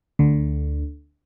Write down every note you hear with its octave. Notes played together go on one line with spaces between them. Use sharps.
D2 D3